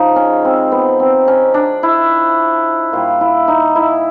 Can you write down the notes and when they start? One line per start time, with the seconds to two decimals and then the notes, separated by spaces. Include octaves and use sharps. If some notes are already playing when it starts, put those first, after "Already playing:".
Already playing: C#3 F3 G#3 D#4
0.16 C#4
0.45 C4
0.72 B3
1.00 C4
1.28 C#4
1.54 D4
1.83 E4
2.92 A#2 G3 F4
3.21 E4
3.48 D#4
3.76 E4